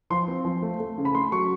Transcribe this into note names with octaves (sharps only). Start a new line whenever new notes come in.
F3 C6
C4
F3
A3
A3
C#3
B5
A3 C6
F#3 C#6